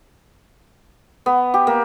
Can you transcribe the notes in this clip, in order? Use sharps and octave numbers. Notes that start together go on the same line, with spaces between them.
B3
G4
A#3